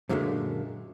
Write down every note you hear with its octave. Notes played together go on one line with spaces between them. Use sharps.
F#2 A#2 D3 D#3 G#3 A3